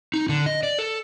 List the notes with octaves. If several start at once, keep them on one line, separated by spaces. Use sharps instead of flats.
D#4
D3
D#5
D5
A4